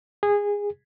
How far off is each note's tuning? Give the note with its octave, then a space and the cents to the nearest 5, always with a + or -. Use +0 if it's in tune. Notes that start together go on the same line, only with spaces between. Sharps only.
G#4 -20